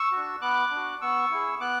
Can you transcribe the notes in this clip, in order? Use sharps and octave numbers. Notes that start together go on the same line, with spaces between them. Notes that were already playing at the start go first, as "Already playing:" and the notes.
Already playing: C#6 E6
D4 F#4
B3 D6 F#6
D4
F#4
B3 C#6 E6
E4 G#4
B3 D6 F#6